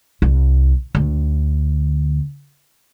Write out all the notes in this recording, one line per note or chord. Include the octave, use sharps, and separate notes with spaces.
C2
D2 D3